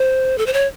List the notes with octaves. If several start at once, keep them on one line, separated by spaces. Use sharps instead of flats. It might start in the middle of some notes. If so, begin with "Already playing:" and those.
Already playing: C5
A4
C5
C#5